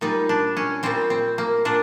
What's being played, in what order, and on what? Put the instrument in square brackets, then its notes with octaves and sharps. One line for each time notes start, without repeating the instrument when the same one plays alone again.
[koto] A#2 G3 D#4
D4
C#4
A#2 G3 C4
C4
A#3
A#2 D4